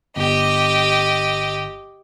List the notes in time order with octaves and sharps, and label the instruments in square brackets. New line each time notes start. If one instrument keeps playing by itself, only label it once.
[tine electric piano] G1 [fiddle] G4 D#5